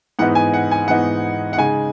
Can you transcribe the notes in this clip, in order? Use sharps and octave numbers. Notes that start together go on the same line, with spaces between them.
G#2 E3 B3 D#4 F#5
G#5
F#5
G#5
G#2 E3 B3 D#4 F#5
F#5
C#3 G#3 D#4 G#5